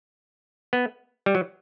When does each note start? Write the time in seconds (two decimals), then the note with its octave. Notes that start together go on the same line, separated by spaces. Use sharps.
0.73 B3
1.26 G3
1.35 F#3